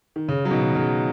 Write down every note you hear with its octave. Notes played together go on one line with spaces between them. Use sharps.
D#3
C#3
F#3
B2 D#3
D#3
C#3 F#3